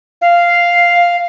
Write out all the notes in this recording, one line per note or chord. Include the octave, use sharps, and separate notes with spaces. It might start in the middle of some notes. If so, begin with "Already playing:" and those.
F5